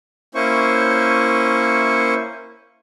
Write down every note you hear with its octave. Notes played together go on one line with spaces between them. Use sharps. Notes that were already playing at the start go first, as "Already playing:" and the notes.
A#3 C#4 E4 C5 C#6